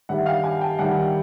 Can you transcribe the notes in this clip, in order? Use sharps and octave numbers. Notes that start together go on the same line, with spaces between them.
G2 D#3 G3 E5 F#5
F5 G5
F#5 G#5
G5 A5
G2 D#3 G3 F#5 G#5